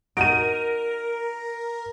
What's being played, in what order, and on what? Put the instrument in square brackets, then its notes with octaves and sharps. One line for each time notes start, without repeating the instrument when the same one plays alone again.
[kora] D#4 F#4 [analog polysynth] A#4 [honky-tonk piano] D7 D#7